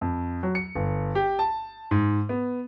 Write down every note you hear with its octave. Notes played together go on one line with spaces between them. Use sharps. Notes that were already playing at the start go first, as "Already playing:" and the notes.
F2
F#3
C#7
G1
G4
A5
G#2
B3